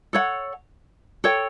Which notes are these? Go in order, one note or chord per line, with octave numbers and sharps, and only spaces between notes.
A4 C#5 F#5
A4 C#5 G5